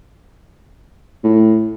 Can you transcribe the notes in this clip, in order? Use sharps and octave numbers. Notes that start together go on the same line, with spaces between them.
A2